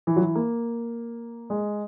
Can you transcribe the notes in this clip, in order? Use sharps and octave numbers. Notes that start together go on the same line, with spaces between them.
E3
F#3
E3
A#3
G#3